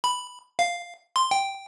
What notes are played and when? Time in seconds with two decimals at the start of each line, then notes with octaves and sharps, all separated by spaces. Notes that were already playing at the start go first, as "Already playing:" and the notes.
0.04 B5
0.59 F5
1.16 C6
1.31 G5